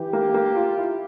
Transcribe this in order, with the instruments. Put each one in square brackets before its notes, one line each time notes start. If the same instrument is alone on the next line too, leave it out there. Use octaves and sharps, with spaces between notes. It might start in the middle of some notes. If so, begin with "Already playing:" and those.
Already playing: [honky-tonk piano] E3 [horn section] G4
[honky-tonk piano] A#3
A#3
F4
E4